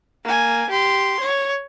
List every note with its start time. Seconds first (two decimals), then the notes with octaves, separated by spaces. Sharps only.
0.24 A#3 G#5
0.70 G4 C6
1.20 C#5